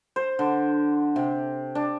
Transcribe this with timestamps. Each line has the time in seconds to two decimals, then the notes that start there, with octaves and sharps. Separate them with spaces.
0.16 C5
0.39 D3
1.16 C3
1.75 D4